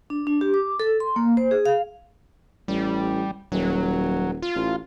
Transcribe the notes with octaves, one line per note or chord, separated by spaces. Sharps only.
D4
D4
G4
D6
A4
C6
A#3
C5
G#4
F5
A1 G3
D#1 F#3
F4
A1